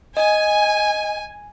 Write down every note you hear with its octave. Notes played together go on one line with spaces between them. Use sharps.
D#5 G#5